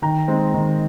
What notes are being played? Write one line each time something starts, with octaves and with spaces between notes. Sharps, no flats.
D#3 G5 A#5
G#3 C4 D#4
D#3